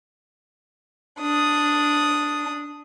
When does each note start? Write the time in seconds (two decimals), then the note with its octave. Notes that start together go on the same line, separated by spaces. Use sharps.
1.20 D4 D#6